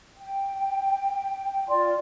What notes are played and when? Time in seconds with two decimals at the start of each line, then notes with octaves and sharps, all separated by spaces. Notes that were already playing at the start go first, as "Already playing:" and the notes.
0.17 G5
1.69 F4 D5 C6